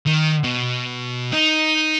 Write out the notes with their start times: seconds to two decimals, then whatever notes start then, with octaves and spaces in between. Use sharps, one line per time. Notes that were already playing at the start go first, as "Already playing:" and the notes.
0.06 D#3
0.44 B2
1.33 D#4